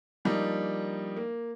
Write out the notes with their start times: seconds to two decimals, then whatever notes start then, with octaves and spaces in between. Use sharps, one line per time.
0.25 F3 G3 A#3 D4 D#4
1.16 A#3